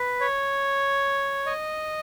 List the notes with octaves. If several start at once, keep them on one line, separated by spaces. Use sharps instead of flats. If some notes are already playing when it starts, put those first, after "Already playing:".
Already playing: B4
C#5
D#5